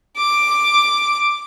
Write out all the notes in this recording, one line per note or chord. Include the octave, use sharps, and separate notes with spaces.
D6